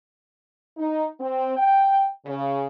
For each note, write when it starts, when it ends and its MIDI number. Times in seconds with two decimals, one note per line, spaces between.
0.77 1.07 63
1.20 1.53 60
1.57 2.08 79
2.26 2.67 49